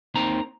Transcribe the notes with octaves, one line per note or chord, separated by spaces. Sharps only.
D#2 D#3 C4 A#5